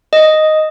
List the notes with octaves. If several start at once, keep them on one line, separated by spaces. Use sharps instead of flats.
D#5